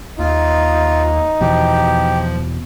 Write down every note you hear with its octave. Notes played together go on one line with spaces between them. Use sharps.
D#2 D#4 F4
E2 B2 F3 G4